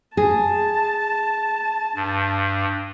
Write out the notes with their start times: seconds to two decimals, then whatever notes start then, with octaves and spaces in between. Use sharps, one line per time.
0.17 G#4 A5
1.95 G2